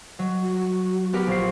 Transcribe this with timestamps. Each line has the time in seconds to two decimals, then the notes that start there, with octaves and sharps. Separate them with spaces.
0.19 F#3 D#5
0.41 F#4
1.13 B3 G4 A#4
1.27 A#1 C7